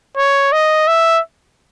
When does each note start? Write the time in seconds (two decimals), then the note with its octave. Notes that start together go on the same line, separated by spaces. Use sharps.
0.17 C#5
0.53 D#5
0.88 E5